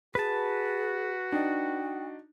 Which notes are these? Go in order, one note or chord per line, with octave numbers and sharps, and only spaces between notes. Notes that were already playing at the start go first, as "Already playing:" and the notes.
F#4 G#4 B4 A5
D4 D#4 G5